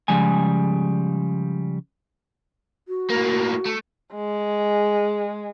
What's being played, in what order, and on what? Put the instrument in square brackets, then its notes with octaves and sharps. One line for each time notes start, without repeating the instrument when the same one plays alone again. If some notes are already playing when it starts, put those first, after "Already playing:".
[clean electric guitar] C#3 F3 G3 G#3 G#5
[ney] F#4
[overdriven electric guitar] A2 A#3
A3
[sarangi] G#3